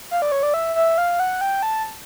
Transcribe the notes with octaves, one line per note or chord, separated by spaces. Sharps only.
F5
D5
C#5
D5
E5
E5
F5
F#5
G5
A5